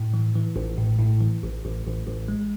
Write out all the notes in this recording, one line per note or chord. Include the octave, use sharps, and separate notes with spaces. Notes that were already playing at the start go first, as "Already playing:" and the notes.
Already playing: A2
E3
E3
A1
A2
A2
E3
A1
A1
A1
A1
G#3